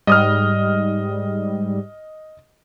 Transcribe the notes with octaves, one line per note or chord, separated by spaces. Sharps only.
G#2 G3 D#5 D#6 F6